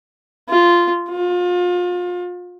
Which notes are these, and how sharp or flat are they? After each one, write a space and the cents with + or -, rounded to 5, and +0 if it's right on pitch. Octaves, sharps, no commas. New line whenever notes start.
F4 -10
F4 +35